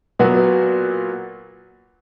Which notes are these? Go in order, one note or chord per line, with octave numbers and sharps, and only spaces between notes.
A#2 F#3 B3 F#4